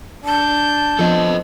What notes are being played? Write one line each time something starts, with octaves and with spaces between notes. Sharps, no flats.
D4 A5 G6
F3 B3 C4 A4 D#5